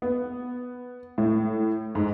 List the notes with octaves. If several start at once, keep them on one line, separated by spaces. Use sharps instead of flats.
B3
A2
G#2